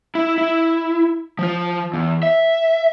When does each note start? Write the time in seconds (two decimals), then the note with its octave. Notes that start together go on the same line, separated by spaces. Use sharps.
0.15 E4
0.38 E4
1.39 F3 F4
1.94 E2
2.23 E5